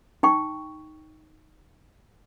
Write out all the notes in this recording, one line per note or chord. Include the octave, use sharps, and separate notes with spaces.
D#4 G5 C#6